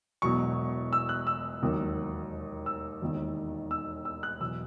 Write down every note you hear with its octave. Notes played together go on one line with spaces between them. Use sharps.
E1 E2 B2 F#3 C#6
E6
F#6
E6
E1 D#2 D#3 F#3
E6
E1 D#2 D#3
E6
E6
F#6
E2 B2 F#3 E6